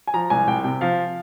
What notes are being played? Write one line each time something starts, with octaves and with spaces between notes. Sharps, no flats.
G#5
F3 A#5
C2 G#5
C2 G5
C3 G5
F3 F5